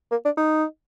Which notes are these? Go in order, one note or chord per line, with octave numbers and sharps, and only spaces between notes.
A#3
D4
D#4